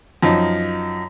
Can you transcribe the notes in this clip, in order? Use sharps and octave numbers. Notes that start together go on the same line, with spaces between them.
F#2 F3 D#4